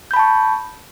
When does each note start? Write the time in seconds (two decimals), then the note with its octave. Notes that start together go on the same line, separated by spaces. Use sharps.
0.11 G6
0.14 B5
0.16 A5
0.19 C#6